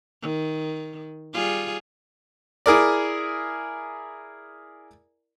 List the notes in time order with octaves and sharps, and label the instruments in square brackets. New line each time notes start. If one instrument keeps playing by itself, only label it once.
[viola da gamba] D#3
G3 F4 G#4
[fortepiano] E4 G#4 A#4 D5